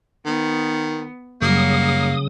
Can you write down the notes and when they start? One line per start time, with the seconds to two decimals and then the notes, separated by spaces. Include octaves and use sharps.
0.26 D#3 B3
1.42 F#2 C#3 F#3 G3 A#3 D#6